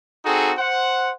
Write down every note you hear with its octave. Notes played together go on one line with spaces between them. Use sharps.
C4 D#4 F#4 G#4 A4
C5 F#5